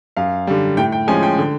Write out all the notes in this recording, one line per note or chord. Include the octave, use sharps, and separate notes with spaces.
F#2 F5
D3 G3
A2 G5
G5
F3 G#3 C#4 G#5
G5
D3